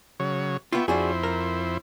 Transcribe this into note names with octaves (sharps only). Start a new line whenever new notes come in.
C#3 F#3 C#5
B3 F4 E5 G5 C#6
F2 D4 E4 F#4 G#4 C5
A#4